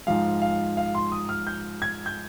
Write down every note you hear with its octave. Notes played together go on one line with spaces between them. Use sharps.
G#2 F3 G#3 F5
F5
F5
C6
D#6
F6
G6
G#6
G6